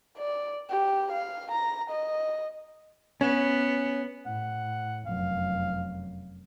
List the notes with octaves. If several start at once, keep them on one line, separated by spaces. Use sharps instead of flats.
D5
G4
F5
A#5
D#5
B3 C#4
A2 F#5
F1 F#2 F5